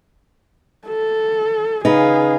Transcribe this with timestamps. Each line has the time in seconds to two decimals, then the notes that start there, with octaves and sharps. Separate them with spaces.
0.87 A4
1.85 C#3 D#4 G#4 B4 F5